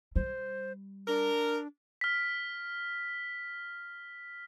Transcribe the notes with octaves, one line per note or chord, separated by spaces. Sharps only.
G3 C5
D4 A#4
F6 B6